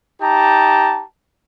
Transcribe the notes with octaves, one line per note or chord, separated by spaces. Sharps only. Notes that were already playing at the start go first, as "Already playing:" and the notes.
D#4 G4 A5 A#5